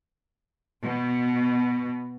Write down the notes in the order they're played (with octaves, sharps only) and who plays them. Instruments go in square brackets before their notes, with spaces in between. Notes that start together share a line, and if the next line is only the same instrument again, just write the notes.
[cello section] B2